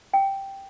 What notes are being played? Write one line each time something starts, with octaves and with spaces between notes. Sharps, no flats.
G5